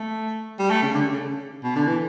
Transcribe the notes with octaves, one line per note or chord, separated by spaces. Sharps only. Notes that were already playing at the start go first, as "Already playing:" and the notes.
Already playing: A3
G3
A3
C#3
D3
C#3
B2
D3
E3